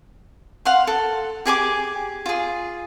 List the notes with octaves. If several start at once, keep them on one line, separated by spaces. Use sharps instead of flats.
F5 F#5 C6
A4
G4 G#4 G#5 D6
F4 G#4